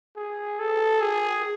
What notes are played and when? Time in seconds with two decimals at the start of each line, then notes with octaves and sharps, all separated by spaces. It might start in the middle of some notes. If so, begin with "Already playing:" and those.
0.16 G#4
0.59 A4
1.01 G#4